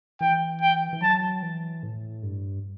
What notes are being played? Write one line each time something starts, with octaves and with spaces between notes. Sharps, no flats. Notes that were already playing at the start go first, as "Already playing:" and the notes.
E3 G5
G5
E3
F#3 A5
E3
A2
G2